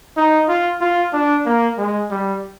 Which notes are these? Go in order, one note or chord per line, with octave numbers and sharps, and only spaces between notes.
D#4
F4
F4
D4
A#3
G#3
G3